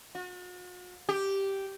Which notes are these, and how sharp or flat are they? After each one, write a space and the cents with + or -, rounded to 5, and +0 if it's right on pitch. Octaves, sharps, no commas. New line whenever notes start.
F#4 -45
G4 -5